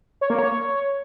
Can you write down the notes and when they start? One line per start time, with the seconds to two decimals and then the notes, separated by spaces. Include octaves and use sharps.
0.21 C#5
0.30 A#3
0.39 C#5